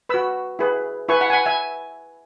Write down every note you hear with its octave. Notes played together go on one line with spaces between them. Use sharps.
F#4 B4 B5 E6
E4 G#4 B4
E4 B4 G#5 C#6
F#5 B5
G#5
F#5 B5
E5 G#5